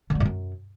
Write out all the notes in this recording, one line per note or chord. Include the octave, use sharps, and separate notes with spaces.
D3
G3
A2
F#2